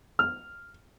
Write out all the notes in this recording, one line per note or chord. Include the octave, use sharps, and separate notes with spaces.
F6